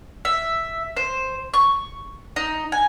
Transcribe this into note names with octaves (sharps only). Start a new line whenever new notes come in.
E5
C5
C#6
D#4
G#5